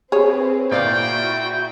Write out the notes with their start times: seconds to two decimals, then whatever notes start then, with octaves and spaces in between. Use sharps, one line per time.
0.12 C4 G#4 B4 C#5
0.71 A#2 E4 F#4 D5 F5 G5